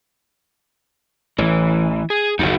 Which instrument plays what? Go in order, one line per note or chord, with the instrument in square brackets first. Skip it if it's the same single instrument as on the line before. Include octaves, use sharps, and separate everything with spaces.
[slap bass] A1 [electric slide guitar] E3
[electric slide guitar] G#4
[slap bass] F#1 D#2 [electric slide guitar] D#4 F#4 E5